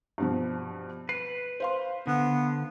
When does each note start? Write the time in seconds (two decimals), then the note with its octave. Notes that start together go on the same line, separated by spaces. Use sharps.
0.18 G2 B2 F3
1.09 B4 C7
1.60 C5 F5 C6
2.07 D3 B3